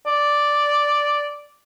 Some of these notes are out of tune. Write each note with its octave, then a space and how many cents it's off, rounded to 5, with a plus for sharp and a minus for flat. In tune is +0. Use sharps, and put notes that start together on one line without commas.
D5 +0